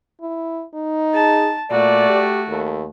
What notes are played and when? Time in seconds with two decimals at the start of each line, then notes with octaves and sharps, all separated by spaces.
0.21 E4
0.74 D#4
1.14 G#4 A5
1.71 A#2 A3 F#4 D5
2.09 G4
2.48 D#2 A4